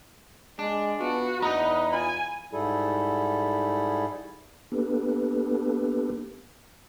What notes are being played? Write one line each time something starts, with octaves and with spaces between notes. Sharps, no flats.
G#3 D4
B3 F4 F#4
E2 D4 D#4 B4 D#5 F#5 A#5
F4 G#5 B5
G#2 G3 E4 G#4 A4
A#3 B3 D4 G4 A4 B4